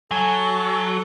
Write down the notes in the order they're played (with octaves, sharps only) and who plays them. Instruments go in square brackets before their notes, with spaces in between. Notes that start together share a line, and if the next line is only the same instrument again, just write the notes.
[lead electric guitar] F#3 [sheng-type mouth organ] A4 [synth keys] G#5